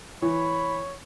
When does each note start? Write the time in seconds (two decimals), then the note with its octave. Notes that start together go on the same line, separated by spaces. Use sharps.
0.22 E3 C#5 B5